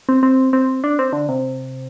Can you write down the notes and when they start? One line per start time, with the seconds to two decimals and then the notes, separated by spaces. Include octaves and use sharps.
0.09 C4
0.23 C4
0.53 C4
0.84 D4
0.99 C4
1.13 D3
1.29 C3